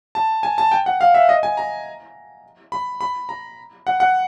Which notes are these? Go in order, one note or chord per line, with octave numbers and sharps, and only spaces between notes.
A5
G#5
A5
G5
F#5
F5
E5
D#5
G#5
A#5
B5
B5
A#5
F#5
F#5